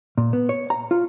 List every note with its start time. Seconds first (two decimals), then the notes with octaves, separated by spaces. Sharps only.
0.18 A#2
0.33 B3
0.49 C#5
0.70 A#5
0.91 F4